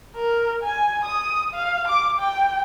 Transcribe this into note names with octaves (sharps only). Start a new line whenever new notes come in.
A#4
G#5
D#6
F5
D6
G5